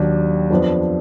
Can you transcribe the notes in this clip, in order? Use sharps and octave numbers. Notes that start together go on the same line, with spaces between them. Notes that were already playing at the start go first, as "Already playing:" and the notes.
Already playing: D#2 D#3 F#3 D4
F2 F3 B3 D4